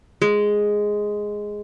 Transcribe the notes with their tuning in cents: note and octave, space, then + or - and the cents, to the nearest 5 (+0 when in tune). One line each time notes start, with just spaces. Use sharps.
G#3 +0